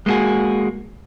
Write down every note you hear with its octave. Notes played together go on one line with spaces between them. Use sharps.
G#3 A#3 B3 F#4 G#4